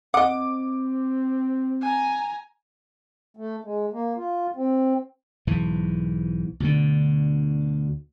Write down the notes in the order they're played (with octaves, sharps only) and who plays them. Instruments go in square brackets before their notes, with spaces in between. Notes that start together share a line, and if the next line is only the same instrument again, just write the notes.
[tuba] C4 [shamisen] D#5 F#5 [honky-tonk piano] D6
[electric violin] G#5 A#5
[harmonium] A3
G#3
A#3
F4
C4
[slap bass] B1 G#2 E3
D2 B2 D3